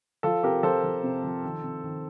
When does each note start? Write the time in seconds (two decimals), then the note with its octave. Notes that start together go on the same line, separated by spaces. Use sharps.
0.23 F3 F4 A4
0.43 C3 G4 A#4
0.63 F3 A4 C5
0.84 F3
1.03 C3
1.23 F3
1.44 D#3
1.63 C3
1.84 D#3